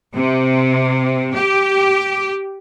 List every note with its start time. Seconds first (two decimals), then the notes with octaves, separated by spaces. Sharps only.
0.14 C3
1.35 G4